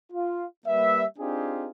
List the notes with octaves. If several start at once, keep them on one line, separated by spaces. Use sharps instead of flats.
F4
G3 A#3 B4 E5
C4 D4 D#4 F4 G4 G#4